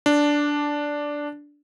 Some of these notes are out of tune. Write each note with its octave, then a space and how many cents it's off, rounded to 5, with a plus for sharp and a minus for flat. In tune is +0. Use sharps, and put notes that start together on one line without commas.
D4 -5